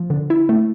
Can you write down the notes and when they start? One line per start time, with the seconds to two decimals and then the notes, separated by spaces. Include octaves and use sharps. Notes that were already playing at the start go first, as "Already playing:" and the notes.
Already playing: F3
0.10 D3
0.30 E4
0.49 A3